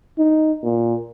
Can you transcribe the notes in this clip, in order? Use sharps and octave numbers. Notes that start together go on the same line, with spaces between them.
D#4
A#2